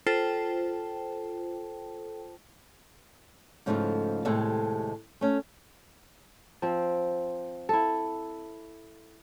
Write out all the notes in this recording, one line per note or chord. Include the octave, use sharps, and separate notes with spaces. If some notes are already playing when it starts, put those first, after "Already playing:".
F4 A4 C5 G5 A5
G#2 C#3 F3 A3 B3 D#4
D#2 A2 C3 G#3 A4 E5
A3 C#4
F3 C4
E4 A4